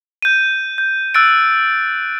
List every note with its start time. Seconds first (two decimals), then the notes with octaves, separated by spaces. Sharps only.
0.22 G6 D#7
0.78 G6
1.14 E6 F#6 A6 D7